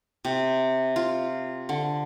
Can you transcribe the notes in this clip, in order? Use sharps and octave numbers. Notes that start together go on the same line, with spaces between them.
C3
F4
D3